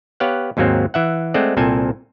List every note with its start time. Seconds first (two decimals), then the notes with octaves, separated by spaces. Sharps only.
0.20 B3 G4 C#5 F5 F#5
0.57 D#2 G#2 F#3 A#3 C4
0.94 E3 E5 F#5
1.34 G#3 A3 C4 D5 F#5
1.57 C2 A#2 C4 A4 G#5